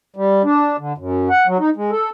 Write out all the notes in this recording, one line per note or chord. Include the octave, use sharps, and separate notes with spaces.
G3
D4
D3
F#2
F#5
F#3
D#4
G#3
A4